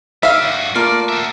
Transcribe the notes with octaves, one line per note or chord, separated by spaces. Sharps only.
D3 E5 F5
G2 F#4
A3 A#3 F4 D5
F#4 E5